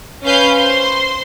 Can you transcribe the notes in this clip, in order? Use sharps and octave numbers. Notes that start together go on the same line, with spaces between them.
C#4 B4 F5 G#5 G6
C5 C6